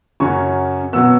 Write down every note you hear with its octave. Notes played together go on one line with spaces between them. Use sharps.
F#2 C#3 F#3 C#4 C#6
B2 F#3 B3 E6